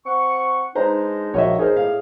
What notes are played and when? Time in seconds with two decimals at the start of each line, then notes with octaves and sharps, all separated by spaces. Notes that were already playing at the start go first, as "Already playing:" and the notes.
0.06 C4 F#5 C#6
0.75 G#3 D4 D#4 B4 C5 A#5
1.34 A#1 A#3 F#4 C#5 D#5 E5
1.59 D#4 G#4 A#4 C5
1.76 A2 F5